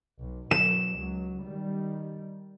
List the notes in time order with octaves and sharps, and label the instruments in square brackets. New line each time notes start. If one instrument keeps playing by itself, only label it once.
[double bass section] B1
[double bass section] B2 F#3 [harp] E7
[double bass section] C#2 F#3
D#3 G3